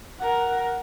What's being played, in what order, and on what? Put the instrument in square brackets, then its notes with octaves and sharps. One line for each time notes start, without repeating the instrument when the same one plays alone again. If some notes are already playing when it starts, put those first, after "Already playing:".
[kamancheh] A#4 F#5